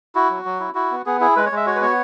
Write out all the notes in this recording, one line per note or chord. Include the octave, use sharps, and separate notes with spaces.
E4 F#4
F#3
F#3
E4
E4 F#4
B3
B3 G#4
E4 G#4
G#3 B4
C#5
G#3 E5
F#4 C#5
B4
B3 C#5